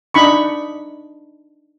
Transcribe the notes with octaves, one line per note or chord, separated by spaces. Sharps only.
D4 D#4 B5 C#6